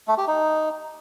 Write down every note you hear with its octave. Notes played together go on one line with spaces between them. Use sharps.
A3
G4
D#4